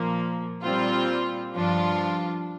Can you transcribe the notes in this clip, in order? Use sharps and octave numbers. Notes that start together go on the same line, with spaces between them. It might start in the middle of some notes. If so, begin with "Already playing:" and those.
Already playing: A#2 F3 A#3
A#2 G3 C4 F4
G2 F3 D4 F4